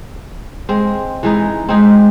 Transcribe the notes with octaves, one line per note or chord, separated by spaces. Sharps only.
G#3 C4
E3 G#3 D#4
G#3 C4 D#4 G#4